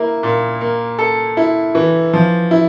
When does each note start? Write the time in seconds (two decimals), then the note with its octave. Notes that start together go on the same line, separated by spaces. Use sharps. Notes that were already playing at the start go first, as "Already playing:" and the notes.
Already playing: A#3 E4
0.23 A#2
0.61 A#3
0.99 A4
1.37 E4
1.75 E3
2.13 F3
2.51 E4